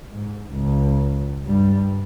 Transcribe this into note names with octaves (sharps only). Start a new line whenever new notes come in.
G#2
C#2
G2 G3